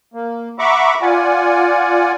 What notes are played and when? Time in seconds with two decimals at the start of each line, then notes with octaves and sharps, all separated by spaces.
0.14 A#3
0.59 E5 F#5 A#5 B5 C#6 D6
1.02 F4 D5 F#5 G#5